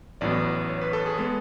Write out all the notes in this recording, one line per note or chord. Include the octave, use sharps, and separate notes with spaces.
A1 A2 F#3 B3 D5
C#5
B4
A4
G#4
G#3 B3 A4